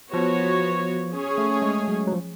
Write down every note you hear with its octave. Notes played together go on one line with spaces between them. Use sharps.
F3 B3 F#4 C#5
C#4 G#4 C#5
A3
G#3
F#3
F#3
F3